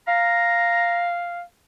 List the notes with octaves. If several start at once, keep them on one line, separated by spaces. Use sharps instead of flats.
F5 A#5